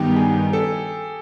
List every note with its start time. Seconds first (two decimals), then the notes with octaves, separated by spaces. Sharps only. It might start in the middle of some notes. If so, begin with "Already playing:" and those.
Already playing: G2 D#3 G3 B3 D#4 G4
0.17 G#4
0.53 A4